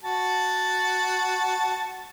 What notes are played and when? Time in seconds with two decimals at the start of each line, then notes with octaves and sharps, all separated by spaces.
0.04 F#4 A5